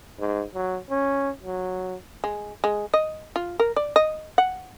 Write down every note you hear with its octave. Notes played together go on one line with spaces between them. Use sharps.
G#2
F#3
C#4
F#3
G#3
G#3
D#5
F4
A#4
D5
D#5
F#5